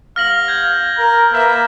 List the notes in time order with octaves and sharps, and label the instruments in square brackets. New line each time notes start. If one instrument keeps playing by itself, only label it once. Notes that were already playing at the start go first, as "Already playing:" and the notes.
[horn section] G2 B3 F5 [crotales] F6 A#6 F#7
[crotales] G6 G#6
[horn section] A#4 [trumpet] A#5
[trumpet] A#3 [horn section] B4 E5